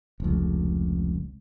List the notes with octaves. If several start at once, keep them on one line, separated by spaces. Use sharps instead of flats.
F1 C#2